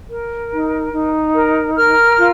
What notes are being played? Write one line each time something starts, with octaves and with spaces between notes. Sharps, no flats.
A#4
D#4
D#4
A#4
A#4 F6
F4